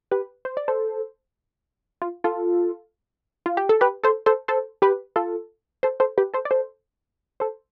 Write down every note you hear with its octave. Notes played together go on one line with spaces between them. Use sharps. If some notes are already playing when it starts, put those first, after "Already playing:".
G4 B4
C5
D5
A4 C5
F4
F4 A4
F4
G4
A4
G4 B4
A4 C5
A4 C5
A4 C5
G4 B4
F4 A4
A4 C5
A4 C5
G4 B4
A4 C5
D5
A4 C5
A4 C5